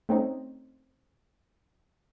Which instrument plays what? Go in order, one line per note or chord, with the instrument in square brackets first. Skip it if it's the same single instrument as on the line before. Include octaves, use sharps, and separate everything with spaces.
[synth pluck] A3 C4 C#4 D#4